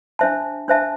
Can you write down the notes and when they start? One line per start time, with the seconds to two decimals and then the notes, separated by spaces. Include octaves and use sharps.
0.19 D4 C5 E5 A5
0.68 D4 C5 E5 A5